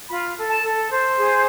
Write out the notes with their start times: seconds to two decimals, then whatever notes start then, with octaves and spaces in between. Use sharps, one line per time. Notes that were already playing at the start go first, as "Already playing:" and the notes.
0.09 F4 B5
0.36 A4
0.49 A5
0.63 A4
0.90 C5
1.16 G#4